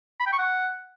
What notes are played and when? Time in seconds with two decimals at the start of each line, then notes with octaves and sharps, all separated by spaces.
0.20 B5
0.26 G5
0.32 C#6
0.39 F#5